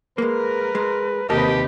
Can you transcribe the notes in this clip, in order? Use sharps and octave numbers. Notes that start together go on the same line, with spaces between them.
G#3 A#3 A#4 B4
G#3
D#2 C3 D#4 G4 A#4 B4 D#5 A5